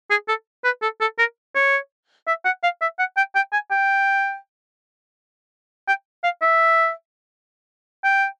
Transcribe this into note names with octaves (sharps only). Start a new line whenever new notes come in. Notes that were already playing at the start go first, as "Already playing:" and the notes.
G#4
A4
B4
A4
A4
A#4
C#5
E5
F#5
F5
E5
F#5
G5
G5
G#5
G5
G5
F5
E5
G5